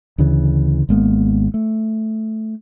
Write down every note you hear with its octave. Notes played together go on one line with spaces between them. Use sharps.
D2 C#3 E3
G#1 G#3 A#3 B3
A3